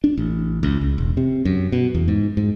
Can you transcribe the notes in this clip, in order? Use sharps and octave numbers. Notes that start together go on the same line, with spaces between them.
D4
A1
C#2
C#2
E1
C3
F#2
B2
E2
G#2
G#2